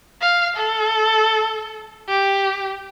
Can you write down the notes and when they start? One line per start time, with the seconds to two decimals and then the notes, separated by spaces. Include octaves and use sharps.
0.21 F5
0.57 A4
2.08 G4